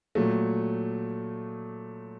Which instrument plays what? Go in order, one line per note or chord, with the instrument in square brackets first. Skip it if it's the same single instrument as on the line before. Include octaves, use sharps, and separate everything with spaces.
[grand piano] A#2 F#3 A3